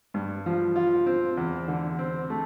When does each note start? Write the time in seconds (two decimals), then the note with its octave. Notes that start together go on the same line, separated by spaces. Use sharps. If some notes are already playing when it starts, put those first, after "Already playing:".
0.14 G2
0.46 F3
0.76 F4
1.06 C4
1.37 E2
1.68 D3
1.99 C4
2.30 A3